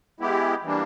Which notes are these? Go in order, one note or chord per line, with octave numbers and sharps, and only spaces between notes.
G#3 B3 E4 G4
E3 G3 A#3 D4